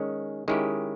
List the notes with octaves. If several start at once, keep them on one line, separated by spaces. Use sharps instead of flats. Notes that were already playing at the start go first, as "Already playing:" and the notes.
Already playing: D#3 G#3 C#4
D#3 G#3 C#4 E4 G4